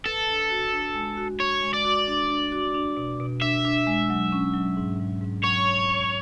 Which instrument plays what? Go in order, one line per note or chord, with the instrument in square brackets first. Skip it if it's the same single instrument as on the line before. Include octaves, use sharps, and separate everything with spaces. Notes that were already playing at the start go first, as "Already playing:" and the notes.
[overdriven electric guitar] A4 [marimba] B4
[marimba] D4
F#4
D4
G#3
F#4
[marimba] F#4 [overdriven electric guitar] C#5
[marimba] G#3
[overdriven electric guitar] D5
[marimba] F#4
D4
D4
F#4
D4
B2
B2
[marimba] D4 [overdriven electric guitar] E5
[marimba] D4
G#3
F#3
C#4
F#3
G#2
G#2
G#2
[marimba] F#3 [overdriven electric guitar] C#5